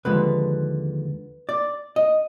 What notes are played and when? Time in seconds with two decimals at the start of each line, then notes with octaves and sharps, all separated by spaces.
0.05 D#2 D3 F3 G#3 B4
1.49 D5
1.96 D#5